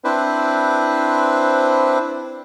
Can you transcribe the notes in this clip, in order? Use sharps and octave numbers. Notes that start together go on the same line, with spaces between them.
C4 D4 E4 B4 C5